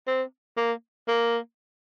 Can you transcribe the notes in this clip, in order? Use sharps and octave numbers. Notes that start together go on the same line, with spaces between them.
C4
A#3
A#3